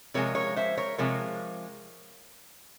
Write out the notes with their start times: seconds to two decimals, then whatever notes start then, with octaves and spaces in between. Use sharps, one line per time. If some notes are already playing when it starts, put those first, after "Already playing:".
0.14 C3 F3 G#3 A#4 C#5
0.35 A#4 C#5
0.56 C5 E5
0.78 A#4 C#5
0.98 C3 F3 G#3 A#4 C#5